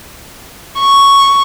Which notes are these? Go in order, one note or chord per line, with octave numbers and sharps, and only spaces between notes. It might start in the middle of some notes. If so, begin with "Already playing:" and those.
C#6